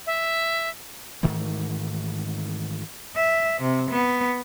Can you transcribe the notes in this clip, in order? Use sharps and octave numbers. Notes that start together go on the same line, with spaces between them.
E5
G#2 D#3 E3 A3
E5
C3
B3